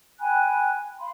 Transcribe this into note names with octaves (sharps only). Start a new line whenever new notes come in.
G5 G#5 B5 F#6
F5 B5 C6